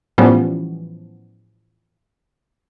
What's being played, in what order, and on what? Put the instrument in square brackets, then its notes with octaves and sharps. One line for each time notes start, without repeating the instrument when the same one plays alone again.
[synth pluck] A2 E3 F3 G3 B3 C#4